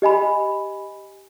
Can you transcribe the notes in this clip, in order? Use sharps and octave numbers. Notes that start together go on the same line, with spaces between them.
G4 D#5 G#5 B5